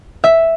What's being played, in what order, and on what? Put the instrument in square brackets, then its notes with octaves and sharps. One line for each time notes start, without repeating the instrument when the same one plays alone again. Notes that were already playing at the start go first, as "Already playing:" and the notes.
[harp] E5